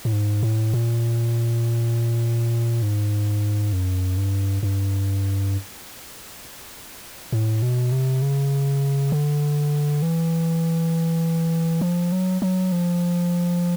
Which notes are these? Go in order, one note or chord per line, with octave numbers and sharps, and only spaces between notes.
A2
G#2
A2
A#2
G#2
F#2
G2
G2
A2
B2
C3
C#3
D3
E3
F3
F#3
F#3
F3